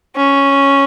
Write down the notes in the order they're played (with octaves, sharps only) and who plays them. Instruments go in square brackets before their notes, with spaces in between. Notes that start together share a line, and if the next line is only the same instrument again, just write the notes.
[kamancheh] C#4